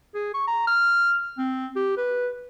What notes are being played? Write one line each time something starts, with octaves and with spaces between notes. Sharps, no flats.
G#4
C#6
A#5
F6
C4
G4
B4